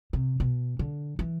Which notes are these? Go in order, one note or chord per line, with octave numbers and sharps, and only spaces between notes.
C3
B2
D3
E3